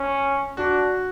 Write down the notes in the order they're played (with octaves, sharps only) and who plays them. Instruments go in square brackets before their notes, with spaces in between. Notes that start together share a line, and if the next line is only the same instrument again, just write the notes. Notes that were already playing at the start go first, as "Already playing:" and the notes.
Already playing: [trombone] C#4
[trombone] D4 [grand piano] F#4